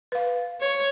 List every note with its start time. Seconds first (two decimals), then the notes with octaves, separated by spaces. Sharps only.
0.12 B4 F5
0.61 C#5